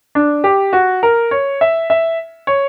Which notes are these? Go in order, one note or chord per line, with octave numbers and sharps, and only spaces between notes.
D4
G4
F#4
A#4
C#5
E5
E5
C#5